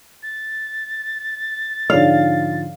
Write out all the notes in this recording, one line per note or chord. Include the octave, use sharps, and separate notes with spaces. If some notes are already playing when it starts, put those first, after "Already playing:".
A6
G#2 D3 F3 G#4 C#5 D5 F5